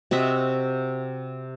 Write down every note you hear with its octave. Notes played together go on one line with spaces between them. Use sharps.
C3 F#4 D#5 E5